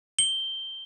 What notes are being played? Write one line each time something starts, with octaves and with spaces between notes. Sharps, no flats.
G7